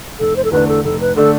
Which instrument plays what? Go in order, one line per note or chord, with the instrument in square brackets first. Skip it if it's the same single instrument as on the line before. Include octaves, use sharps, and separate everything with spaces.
[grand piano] F1 [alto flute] A4
[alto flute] C5
A4
[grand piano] E2 D3 A3 D4 [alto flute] B4
[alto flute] A4
[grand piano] F1 [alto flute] A4
[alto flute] B4
[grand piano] D3 A3 D4 [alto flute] A4